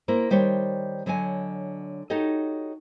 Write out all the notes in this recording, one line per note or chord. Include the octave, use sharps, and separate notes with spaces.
A#3 E4 A#4 C5
D#3 G3 G4 C5 C#5
D3 F#3 C#5 D#5 G#5
D#4 F#4 G4 A4 C#5 D#5